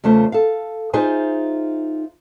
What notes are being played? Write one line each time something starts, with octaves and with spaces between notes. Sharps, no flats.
E2 C#3 A3 F4 C5
A4 F5
D#4 F4 G#4 C5 E5 G#5